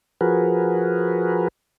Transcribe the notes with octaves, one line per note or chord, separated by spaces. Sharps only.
F3 F#4 G#4 A#4 B4